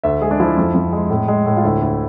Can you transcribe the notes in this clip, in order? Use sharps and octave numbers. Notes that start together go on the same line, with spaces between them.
D2 E5
G#3 G#4
D4
F3 E4
F2
F2
G#3
A2
G#3
A2
F4
D2 E4
D2